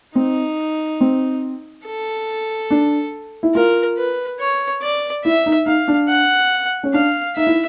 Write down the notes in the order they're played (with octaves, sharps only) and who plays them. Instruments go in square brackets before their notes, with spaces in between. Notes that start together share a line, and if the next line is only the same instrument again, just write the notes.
[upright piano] C4 [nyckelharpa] D#4
[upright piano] C4
[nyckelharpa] A4
[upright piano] D4
E4
[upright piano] F4 [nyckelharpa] A#4
[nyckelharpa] B4
C#5
D5
[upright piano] E4 [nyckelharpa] E5
[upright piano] D#4
[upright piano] D#4 [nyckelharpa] F5
[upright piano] D4
[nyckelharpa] F#5
[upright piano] C#4
[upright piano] D4 [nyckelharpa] F5
[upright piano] D#4 [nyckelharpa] E5
[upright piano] E4